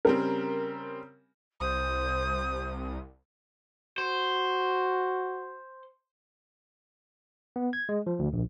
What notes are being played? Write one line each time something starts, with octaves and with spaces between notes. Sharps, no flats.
C#3 G3 C4 A#4
C2 C5 D#6
F#4 C5
B3
G#6
G#3
F3
D2
A#1